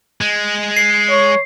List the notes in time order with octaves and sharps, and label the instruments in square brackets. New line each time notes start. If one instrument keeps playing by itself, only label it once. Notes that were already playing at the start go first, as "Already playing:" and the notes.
[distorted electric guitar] G#3
[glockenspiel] C7
[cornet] C#5